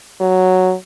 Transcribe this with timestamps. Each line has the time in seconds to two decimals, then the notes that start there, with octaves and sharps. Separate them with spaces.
0.21 F#3